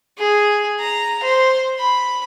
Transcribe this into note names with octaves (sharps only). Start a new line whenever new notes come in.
G#4
A#5
C5
B5